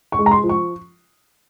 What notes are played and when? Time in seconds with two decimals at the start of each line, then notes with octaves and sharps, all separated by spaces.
0.12 C#6
0.19 G#3
0.26 A#5
0.31 C6
0.43 F3
0.49 C#6